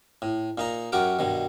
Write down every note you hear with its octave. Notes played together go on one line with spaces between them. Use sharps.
A2
A#2 D#4 A#5
F#2 F#4 G4 A#4 G5
G2 B2 D#3